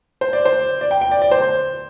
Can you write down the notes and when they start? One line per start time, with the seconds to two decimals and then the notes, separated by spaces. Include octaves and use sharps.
0.21 C5
0.33 D5
0.45 C5
0.81 D5
0.91 G5
1.01 G5
1.12 D5
1.22 D5
1.31 C5
1.42 C5